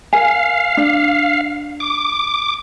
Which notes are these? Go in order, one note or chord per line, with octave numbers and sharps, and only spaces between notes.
A#4 F5 G#5
D4
D6